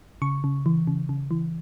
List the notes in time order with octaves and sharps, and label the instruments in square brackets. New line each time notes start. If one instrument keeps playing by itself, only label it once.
[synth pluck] C#3 C#6
C#3
E3
C#3
C#3
E3